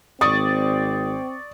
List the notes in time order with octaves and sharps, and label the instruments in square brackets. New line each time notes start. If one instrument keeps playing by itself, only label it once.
[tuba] G#1 [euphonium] C4 [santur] D5 C#6 [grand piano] D#6